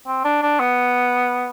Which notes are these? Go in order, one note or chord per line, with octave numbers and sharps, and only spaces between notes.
C4
D4
D4
B3